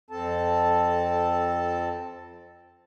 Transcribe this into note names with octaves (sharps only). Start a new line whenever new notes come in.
F2 C4 A4 A5